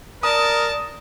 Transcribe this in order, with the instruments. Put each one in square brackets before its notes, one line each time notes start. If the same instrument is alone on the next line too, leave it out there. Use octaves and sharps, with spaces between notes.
[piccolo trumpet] A#4 [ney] D5 [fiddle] A5 [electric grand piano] D#6